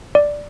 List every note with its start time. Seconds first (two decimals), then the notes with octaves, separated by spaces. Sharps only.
0.15 D5